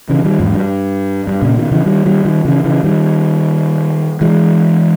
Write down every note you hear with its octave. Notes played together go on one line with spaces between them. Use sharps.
C#3 E3
D#3 G3
E2 G#2
G2
G2
A#2 C#3
B2 D#3
C#3 E3
D#3 G3
D#3 G3
D#3 G3
C#3 E3
C#3 E3
D#3 G3
E3 G#3